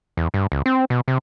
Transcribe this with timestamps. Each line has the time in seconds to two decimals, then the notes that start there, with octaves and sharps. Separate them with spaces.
0.17 E2
0.34 G2
0.52 C#2
0.66 C4
0.90 B2
1.08 C3